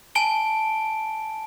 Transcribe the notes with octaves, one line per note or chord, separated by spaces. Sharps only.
G#5 A5 D7 G7